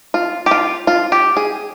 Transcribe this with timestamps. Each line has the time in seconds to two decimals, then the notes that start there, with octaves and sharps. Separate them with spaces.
0.14 F4
0.46 G4
0.51 F4
0.87 F4
1.12 G4
1.37 G#4